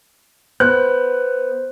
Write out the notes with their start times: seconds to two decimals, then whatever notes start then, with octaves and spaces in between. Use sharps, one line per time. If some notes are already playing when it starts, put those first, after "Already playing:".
0.60 B3 C5 F#6